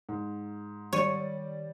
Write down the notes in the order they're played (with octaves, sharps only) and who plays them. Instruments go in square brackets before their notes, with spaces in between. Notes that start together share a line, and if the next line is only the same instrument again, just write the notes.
[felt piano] G#2
[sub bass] D#3 [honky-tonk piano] G3 D5 D#7 [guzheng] C#5